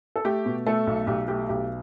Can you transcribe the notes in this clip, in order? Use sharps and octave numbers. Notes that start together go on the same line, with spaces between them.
A4
A3 G4
B2
A3 A4
B1
B1 G4
A3 G4
B1 G4